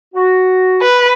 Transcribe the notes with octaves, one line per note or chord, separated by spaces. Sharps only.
F#4
B4